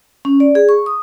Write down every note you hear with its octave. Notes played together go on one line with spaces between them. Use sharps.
C#4
D5
G#4
C#6
D#6